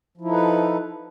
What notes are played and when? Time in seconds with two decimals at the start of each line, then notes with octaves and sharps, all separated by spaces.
0.17 F3
0.21 E4
0.24 D#4
0.28 A4
0.32 B4